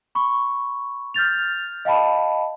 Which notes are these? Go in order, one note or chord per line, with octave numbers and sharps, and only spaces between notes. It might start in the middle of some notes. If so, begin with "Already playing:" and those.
B5 C#6
F6 G6 A6 F7
D#5 F5 G5 A5 B5